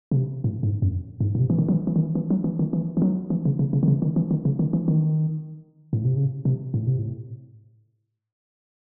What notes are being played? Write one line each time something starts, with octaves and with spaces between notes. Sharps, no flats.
C#3
C3
A2
G#2
F#2
G#2
A2
C3
E3
D#3
F#3
E3
E3
D#3
E3
E3
F#3
E3
D#3
E3
E3
F#3
E3
C#3
C#3
C#3
D#3
C#3
D#3
E3
D#3
C#3
D#3
E3
D#3
A2
C3
C#3
C3
A2
C3
A2